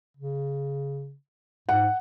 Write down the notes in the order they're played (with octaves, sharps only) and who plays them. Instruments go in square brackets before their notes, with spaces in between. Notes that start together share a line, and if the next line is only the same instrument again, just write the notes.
[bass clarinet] C#3
[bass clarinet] G#2 [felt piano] F#5